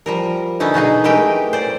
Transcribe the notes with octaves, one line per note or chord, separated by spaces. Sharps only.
F3 G3 A#4
D3 B3 C#4 D#4 E4
B2 F#3 D#4 G#4
E3 G#3 A3 G4 A#4 G5
C5 D5